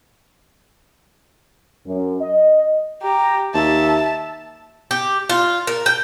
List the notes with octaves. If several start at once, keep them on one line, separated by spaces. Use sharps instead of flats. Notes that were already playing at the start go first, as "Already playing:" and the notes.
F#2
D#5
G4 A#5
D#2 E5 A5
G4
F4
A#4
G5